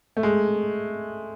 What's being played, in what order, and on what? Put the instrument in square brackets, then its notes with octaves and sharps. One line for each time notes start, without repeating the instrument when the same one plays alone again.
[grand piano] A3
G#3